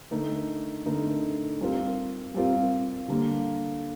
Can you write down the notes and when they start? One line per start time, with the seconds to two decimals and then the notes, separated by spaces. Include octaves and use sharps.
0.11 D3 A3 D#4 A#4
0.86 D3 A3 D#4 A#4
1.60 G3 C4 F4 A#4
2.34 G3 C4 F4 A#4
3.08 D3 G3 A#3